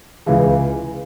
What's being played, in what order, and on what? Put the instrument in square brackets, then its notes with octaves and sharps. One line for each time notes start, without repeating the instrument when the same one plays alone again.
[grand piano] C#2 C#3 E3 G#3